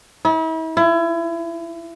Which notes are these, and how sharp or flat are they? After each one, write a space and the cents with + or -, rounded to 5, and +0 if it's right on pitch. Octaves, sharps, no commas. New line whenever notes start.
E4 -40
E4 +30